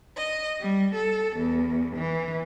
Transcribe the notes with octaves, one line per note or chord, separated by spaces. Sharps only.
D#5
G3
A4
E2
E3